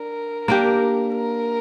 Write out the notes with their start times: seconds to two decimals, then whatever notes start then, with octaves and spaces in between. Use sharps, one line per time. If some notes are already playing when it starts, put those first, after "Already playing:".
Already playing: D4 A#4
0.48 A#3 D4 G4
1.15 A#4